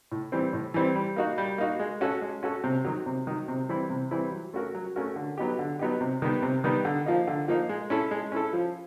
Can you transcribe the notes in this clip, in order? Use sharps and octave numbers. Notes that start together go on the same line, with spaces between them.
A2
E3 G3 C4
A2
E3 G3 C4
G3
A#3 D#4 F#4
G3
A#3 D#4 F#4
G#3
C#4 F#4 A4
G#3
C#4 F#4 A4
C3
D#3 F#3
C3
D#3 F#3
C3
E3 G3 C4 E4
C3
E3 G3 C4 E4
F#3
A3 C#4 F#4 A#4
F#3
A3 C#4 F#4 A#4
D3
F#3 B3 D#4 G4
D3
F#3 B3 D#4 G4
C3
D#3 G3 B3
C3
D#3 G3 B3
D3
F3 A#3 D#4
D3
F3 A#3 D#4
G#3
C#4 E4 A4
G#3
C#4 E4 A4
F3